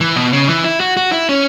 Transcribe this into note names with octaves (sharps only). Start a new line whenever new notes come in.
E3
B2
C#3
E3
E4
F#4
F#4
E4
C#4